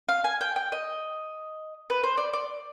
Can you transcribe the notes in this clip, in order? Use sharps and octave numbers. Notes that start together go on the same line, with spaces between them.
F5
G#5
G5
G5
D#5
B4
C5
D5
D5